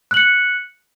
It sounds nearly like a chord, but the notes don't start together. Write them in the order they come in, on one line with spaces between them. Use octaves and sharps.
F#6 F#7 C#7